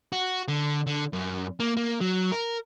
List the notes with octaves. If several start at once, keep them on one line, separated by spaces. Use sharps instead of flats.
F#4
D3
D3
F#2
A#3
A#3
F#3
A#4